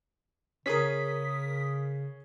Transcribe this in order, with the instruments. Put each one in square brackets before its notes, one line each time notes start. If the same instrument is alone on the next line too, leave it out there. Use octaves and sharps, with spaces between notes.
[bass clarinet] C#3 [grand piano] C#4 G#4 [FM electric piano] A#4 D#6 B6